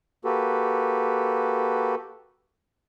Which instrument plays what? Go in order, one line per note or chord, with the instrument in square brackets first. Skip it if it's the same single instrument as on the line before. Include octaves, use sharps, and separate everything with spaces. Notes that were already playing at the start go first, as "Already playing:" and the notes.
[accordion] A#3 F#4 G4 A4 B4